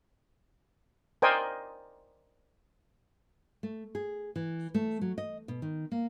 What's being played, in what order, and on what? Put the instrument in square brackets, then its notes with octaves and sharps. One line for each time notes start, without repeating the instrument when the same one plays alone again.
[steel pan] A#4 C5 D5 D#5 G5 G#5
[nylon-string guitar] A3
G#4
E3
A3
F#3
D#5
B2
D#3
A#3